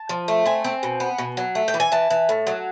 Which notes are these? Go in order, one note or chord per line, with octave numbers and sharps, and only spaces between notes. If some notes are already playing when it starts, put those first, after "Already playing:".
Already playing: A5
F3
A3
C4 G#5
C4
B2
B3
B2
F#3
A3
G5
E3
G#5
E3 A5
E3
A2
F#3